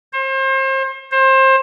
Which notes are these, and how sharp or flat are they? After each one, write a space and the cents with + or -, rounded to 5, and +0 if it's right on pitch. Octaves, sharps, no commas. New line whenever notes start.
C5 +35
C5 +25